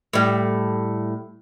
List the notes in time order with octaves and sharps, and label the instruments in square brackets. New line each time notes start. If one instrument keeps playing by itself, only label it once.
[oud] A2 G3